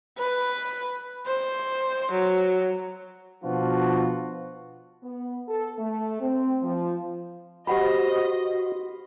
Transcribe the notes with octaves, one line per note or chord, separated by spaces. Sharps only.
B4
C5
F#3
B2 F3 B3 D4 F4 F#4
B3
A4
A3
C4
F3
F#4 G4 B4 C5 D#5 F5 F#5 B5